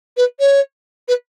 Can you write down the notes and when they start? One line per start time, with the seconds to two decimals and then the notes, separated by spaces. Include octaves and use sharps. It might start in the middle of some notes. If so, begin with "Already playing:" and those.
0.17 B4
0.39 C#5
1.08 B4